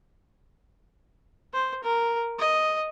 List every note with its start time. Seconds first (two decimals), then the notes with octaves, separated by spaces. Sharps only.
1.53 C5
1.84 A#4
2.39 D#5